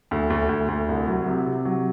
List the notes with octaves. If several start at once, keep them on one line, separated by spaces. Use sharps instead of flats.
D2
D2
D2
D2
C2
F#3
C3
C3
F#3